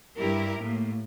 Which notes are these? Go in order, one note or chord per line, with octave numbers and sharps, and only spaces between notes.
G2 E4 G4 A#4
A2 A#3